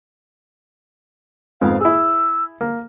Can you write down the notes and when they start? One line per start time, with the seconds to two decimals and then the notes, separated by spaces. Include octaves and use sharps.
1.61 F2 G#2 B3 F5
1.81 E4 G#4 E6
2.61 A#3